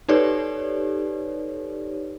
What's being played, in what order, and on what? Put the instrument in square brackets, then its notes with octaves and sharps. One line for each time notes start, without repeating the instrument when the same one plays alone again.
[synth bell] D#4 G4 A4 B4 C#5 D5